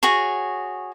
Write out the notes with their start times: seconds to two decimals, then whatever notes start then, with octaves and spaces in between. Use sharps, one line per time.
0.03 F#4 G#4 C#5